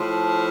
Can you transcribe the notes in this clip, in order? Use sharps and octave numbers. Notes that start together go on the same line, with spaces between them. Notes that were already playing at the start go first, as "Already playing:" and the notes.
Already playing: A2 F3